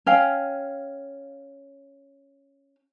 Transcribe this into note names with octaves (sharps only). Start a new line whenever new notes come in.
C#4 F5 G5